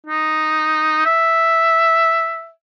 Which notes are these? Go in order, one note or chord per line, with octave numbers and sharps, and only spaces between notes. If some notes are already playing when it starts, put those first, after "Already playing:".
D#4
E5